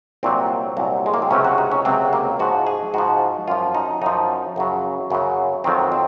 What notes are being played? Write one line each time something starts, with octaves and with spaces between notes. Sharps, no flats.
C2 A#2 F#3 C4
C2 A#2 F#3
G#3
A#3
C4
C#2 C3 F#3 C#4
F#4
D#4
C#4
C#2 C3 F#3 C4
A#3
G#2 F3 F#4
G#4
G#2 F3 F#4
F#2 F3 F4
D#4
F#2 F3 D#4
F#2 C#3 F#3
F#2 C#3 F#3
F2 D#3 F#3 C4
C4